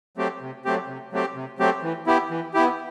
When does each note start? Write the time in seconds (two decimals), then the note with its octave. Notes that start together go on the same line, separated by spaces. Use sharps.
0.17 F#3 A3 C4 G4
0.41 C3
0.65 F#3 A3 C4 G4
0.88 C3
1.12 F#3 A3 C4 G4
1.35 C3
1.59 F#3 A3 C4 G4
1.83 E3
2.07 B3 E4 G4
2.30 E3
2.54 B3 E4 G4